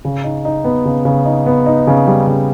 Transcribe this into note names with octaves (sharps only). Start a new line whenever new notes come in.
C#3
D#4
D#4
B3
C#3
C#3
D#4
B3
D#4
C#3
G3
C#3